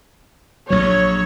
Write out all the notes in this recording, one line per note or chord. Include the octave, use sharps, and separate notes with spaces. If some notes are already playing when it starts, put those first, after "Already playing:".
A#1 F#3 C#5